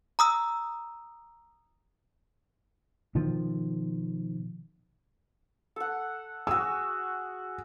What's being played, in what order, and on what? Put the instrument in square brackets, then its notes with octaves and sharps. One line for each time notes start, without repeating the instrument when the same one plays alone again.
[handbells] A#5 D#6 E6
[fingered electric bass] B2 D#3 F3
[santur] A4 F#5
[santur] F#4 G#4 [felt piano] E6